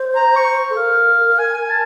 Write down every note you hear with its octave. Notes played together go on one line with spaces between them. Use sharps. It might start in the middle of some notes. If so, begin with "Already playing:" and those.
Already playing: C5
A#5
C#6
A4
A#4 F5
G#5
G#5
A5